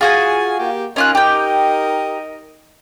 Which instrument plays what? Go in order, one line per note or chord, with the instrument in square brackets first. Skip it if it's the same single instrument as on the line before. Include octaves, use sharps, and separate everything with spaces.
[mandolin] F4 F#4 G#5 [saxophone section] G#4
[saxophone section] A#3 G4
[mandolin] C#4 F4 F#6 [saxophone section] D#4 A#4 D#5
[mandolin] G4 G5